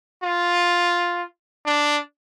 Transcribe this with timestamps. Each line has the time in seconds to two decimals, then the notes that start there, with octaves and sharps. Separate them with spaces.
0.23 F4
1.66 D4